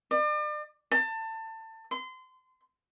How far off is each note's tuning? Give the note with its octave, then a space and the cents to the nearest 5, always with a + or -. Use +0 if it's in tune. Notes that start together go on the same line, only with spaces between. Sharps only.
D5 +40
A5 +25
C6 -30